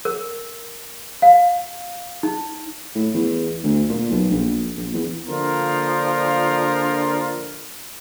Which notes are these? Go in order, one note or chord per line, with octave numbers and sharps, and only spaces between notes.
A#4
F5
D#4
A2
E2
D2
A#2
B1
A#1
A#1
E2
D3 F3 A#3 D4 F4 A#4